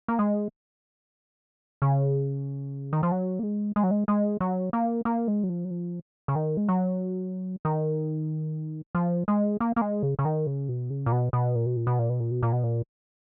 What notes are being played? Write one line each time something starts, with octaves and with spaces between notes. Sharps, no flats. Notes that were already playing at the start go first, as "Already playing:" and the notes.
A#3
G#3
C#3
D#3
F3
F#3
A#3
G#3
G#3
F#3
G#3
G#3
F#3
A#3
A#3
G#3
F#3
F3
F#3
F3
C#3
D#3
G#3
F#3
D#3
F3
G#3
A#3
A#3
G#3
C#3
C#3
D#3
C#3
B2
C#3
A#2
B2
B2
A#2
B2
A#2
B2
A#2
B2
A#2
B2
A#2
B2
A#2